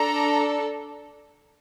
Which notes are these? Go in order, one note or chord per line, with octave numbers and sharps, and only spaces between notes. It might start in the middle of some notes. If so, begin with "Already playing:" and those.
Already playing: D4 A4 A#5